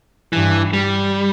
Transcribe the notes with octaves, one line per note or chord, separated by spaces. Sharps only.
G2 E3
G3